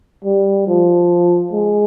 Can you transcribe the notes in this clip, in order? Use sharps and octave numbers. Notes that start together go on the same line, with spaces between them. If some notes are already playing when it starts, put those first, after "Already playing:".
G3
F3
G#3